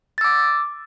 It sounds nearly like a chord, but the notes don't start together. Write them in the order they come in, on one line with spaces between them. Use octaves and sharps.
A6 E6 D6